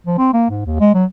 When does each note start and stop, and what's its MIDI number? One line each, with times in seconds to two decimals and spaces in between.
0.07 0.18 53
0.18 0.31 60
0.34 0.48 58
0.50 0.63 44
0.65 0.76 39
0.80 0.91 56
0.94 1.05 54